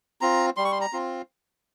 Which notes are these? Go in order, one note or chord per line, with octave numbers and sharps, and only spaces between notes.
C4 F4 A#5
G3 C6
C#6
C6
A#5
C4 F4